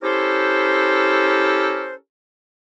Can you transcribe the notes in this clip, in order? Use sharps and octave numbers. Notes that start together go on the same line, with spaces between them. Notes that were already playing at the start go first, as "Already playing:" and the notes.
C#4 E4 G4 A4 A#4 C5